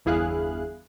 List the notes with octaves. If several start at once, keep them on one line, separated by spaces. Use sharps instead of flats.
G1 E2 E4 G#4 F5 F#6